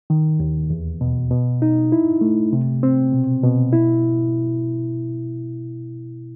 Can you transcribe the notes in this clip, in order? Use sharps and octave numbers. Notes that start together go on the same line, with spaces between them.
D#3
D#2
E2
B2
B2
D#4
E4
A3
C3
C4
B2
B2
E4